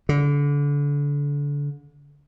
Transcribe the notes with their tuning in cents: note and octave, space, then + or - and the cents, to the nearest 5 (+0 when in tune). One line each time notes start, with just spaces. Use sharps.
D3 -30